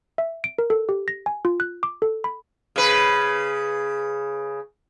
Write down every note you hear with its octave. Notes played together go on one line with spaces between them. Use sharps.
E5
D7
A#4
A4
G4
A#6
G#5
F4
F#6
D6
A4
B5
C#3 B4